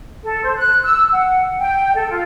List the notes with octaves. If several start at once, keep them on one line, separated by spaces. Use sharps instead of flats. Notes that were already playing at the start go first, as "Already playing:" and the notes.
A4
C5
F#6
E6
F#5
G5
A4
F4